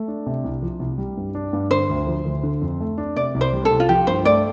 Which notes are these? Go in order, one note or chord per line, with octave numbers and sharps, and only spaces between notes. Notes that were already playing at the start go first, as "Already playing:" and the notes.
Already playing: A3
D4
C3
C2
F3
C2
G3
G2
D4
G2
D3 C5
D2
F3
D2
D3
F2
A3
D4
C3 D5
C2
C5
G3
A4
C2
F4
F3 G4
G2 C5
A3 D5